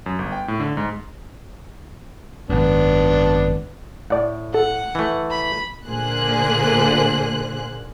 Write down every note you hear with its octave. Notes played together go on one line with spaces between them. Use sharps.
F#2
G1
G5
A2
D3
G#2
G#1 F#2 B3 D4
A2 D5 F#5
A4 F#5
E3 A3
B5
A#2 D3 A#3 G#4 C5 F#6